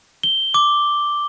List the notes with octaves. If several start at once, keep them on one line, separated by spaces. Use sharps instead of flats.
G7
D6